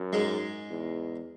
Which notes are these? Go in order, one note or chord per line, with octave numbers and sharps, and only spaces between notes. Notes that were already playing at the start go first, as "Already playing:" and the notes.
Already playing: F#2
G#2 G#3
E2